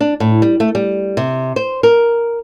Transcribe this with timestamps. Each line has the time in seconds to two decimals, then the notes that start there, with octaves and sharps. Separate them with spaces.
0.01 D4
0.20 A2
0.42 G3
0.60 A3
0.75 G3
1.17 C3
1.56 C5
1.83 A#4